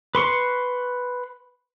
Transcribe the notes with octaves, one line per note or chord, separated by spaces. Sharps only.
B4 C6 C#6